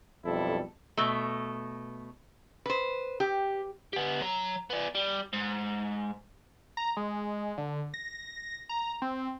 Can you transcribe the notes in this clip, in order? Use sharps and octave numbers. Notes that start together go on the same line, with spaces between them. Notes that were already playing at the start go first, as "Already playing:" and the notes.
B1 F2 G3 E4 A4
B2 A3
B4 C5
G4
B3 G4
F#3 A#5
B3 D5
G3
G#2
A#5
G#3
D3
A#6
A#5
C4